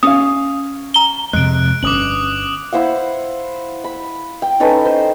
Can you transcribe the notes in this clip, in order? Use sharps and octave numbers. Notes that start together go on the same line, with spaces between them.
C#4 F5 D#6
A#5 G7
F2 C3 G#3 F#6 D7
G1 C#4 D6 D#6 F#7
E4 C5 F5 F#5
B5
G5
C#4 D#4 A4 B4
C5